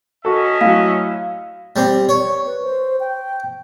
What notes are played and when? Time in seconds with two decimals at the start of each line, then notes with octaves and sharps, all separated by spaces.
0.25 C#4 F#4 A4 D#5 E5
0.61 A2 F#3 F5
1.76 G3 C4
2.09 C#5 C#6
2.47 B4
2.63 C5
3.00 G5